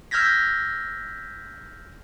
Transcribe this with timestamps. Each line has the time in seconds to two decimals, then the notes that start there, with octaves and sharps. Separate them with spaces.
0.11 E6 F6 G6 G#6 A#6 B6